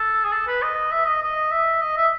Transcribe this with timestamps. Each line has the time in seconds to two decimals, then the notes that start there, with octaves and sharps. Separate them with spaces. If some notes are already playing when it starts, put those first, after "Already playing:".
Already playing: A4
0.25 G#4
0.32 A4
0.47 B4
0.62 D#5
0.92 E5
1.07 D#5
1.22 D#5
1.51 E5
1.81 D#5
1.97 E5